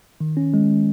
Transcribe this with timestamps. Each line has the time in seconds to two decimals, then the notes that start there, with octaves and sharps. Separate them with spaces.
0.20 D#3
0.37 C#4
0.54 G#3